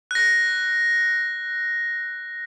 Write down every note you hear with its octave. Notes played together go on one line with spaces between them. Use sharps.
F#6 A#6